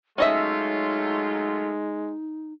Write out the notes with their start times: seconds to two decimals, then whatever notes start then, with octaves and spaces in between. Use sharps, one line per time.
0.18 F#3 G#3 A3 C#4 D#4 F4 D#5 E5